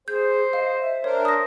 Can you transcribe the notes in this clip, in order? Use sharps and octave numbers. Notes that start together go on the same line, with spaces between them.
G#4 C5 G6
D#5 F5
E5
D4 A#4 C5 C#5
D#6 A#6